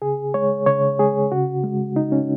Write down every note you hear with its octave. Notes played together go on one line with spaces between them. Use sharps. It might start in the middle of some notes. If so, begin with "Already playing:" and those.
C#3 G#4
G#3 C#5
C#3 C#5
G#3 G#4
C#3 F#4
G#3
C#3 D#4
C#4